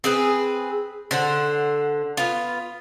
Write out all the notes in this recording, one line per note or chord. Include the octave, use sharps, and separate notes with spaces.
C4 G#4 B4
D3 C5 F#5
B3 F4